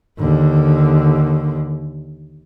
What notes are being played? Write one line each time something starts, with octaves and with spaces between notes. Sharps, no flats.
D#2 D3